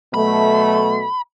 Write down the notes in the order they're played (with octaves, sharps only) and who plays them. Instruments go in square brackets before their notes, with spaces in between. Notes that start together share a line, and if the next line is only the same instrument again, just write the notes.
[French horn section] B2 F#3 A3 [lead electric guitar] B5